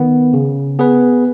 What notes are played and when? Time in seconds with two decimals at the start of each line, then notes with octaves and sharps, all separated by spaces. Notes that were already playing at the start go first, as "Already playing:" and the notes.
Already playing: D#3 B3
0.34 C#3
0.79 B3 G#4 B4